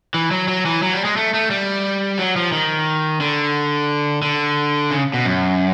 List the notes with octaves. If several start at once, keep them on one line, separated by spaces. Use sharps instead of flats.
E3
F#3
F#3
E3
F#3
G3
G#3
A3
A3
G3
F#3
F3
D#3
D3
D3
C#3
B2
F#2